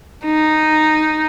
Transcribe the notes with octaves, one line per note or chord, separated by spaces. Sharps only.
D#4